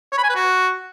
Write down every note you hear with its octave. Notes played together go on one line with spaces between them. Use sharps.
C#5
B5
G#5
B4
F#4